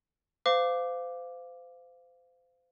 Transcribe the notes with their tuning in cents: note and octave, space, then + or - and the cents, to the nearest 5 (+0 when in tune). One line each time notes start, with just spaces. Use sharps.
C5 -35 F5 +0 D6 +0